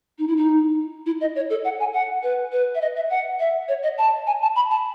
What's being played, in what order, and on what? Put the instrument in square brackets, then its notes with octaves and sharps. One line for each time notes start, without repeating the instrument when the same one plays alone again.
[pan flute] D#4
E4
D#4
E4
D#5
C#5
A4
F#5
G#5
F#5
B4
B4
E5
D#5
E5
F#5
E5
C#5
D#5
A5
G#5
A5
B5
A5